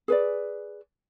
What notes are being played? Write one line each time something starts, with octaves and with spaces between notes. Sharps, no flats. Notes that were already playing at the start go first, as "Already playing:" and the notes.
G#4 B4 D5